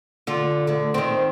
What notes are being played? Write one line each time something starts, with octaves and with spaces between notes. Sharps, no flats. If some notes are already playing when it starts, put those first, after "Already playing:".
D3 F4
D2 D3
D#3 C4